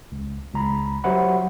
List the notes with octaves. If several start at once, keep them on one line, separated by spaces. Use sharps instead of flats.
C#2
C#2 A#5 B5
F#3 G4 C5 E5 F#5 B5